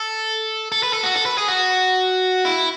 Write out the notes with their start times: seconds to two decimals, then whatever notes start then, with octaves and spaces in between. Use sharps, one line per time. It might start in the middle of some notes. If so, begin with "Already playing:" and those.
Already playing: A4
0.72 A4
0.83 B4
0.93 A4
1.04 F#4
1.15 A4
1.26 B4
1.38 G#4
1.48 F#4
2.45 E4